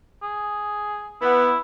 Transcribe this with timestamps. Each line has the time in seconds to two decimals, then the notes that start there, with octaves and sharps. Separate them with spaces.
0.22 G#4
1.22 B3 E4